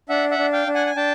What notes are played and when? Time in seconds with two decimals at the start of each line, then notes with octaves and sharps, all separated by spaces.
0.09 D4 E5 F#5
0.31 E5 F#5
0.38 D4
0.53 F5 G5
0.67 D4
0.75 F#5 G#5
0.86 G#5
0.96 D4 G5 A5